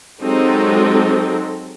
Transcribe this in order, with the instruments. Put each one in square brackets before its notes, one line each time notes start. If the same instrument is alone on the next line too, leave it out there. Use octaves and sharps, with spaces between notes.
[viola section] F#3 G#3 C4 D#4 G4 A4